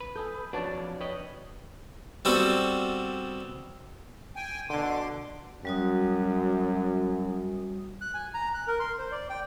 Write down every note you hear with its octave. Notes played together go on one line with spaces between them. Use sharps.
B4
A4 G#5 D#6 G6
F2 D4 F#4 B4 C#5 D5 A5
B4 C#5 D#5 G5
G3 B3 C4 F#4 A4
G5 G#5
B2 D3 C6 D6
F#2 G3 F#4 D#6
F#6
G#5
A#5
F#6
A#4
C6
C5
D5
G5